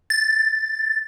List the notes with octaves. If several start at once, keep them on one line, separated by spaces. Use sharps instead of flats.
A6